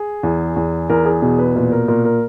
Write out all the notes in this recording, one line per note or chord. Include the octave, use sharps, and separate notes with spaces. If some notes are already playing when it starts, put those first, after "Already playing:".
Already playing: G#4
E2
E2
E2 A#4
G#4
B2 G#4
B4
A#2 B4
A#4
A#2 A#4
A#4